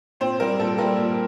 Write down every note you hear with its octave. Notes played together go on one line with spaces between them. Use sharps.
A#2 C4 C5
G3 A#3 A#4
A#2 A4
G3 A#3 A#4
A#2